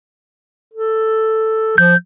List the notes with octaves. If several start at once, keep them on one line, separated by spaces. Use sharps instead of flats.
A4
F3 G6